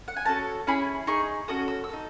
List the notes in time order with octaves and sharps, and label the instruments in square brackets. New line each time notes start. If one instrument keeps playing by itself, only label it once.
[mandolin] F#5
G#5
C#4 F#4 A4 A5
C#4 E4 G#4 B5
D#4 G#4 C#6
C#4 F#4 A4 D#6
E6
E6
D#4 A4